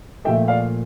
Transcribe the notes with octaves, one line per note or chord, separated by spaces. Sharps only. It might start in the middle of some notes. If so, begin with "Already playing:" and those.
A#2 F3 A3 E5 G5
D5 F5